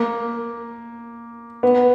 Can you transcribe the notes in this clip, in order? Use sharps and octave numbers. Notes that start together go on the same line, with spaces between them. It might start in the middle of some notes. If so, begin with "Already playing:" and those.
Already playing: A#3
B3